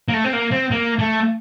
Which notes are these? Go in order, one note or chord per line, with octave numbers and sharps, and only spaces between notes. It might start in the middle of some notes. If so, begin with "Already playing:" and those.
A#3
A3
C4
A#3
C4
A#3
A3